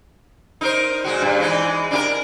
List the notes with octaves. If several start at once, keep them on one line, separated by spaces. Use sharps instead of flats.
D#4 A#4 C5
A#2 G#3 F#4
G2
E3 G#3 D#4
D4 E4 A#4